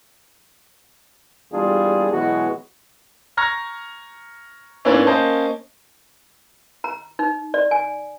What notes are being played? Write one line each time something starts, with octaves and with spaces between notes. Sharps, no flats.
E2 G3 A#3 D4 F4 G#4
B2 E3 F#3 G#3 B3 F#4
A#5 C#6 F6 G#6 A#6
G#2 E3 A#3 B3 C#4 D4
A#3 C#4 C5 D#5 A5
A#5
D#4
D5
G#5